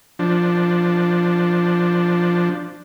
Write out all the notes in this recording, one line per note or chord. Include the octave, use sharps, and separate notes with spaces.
F3 D4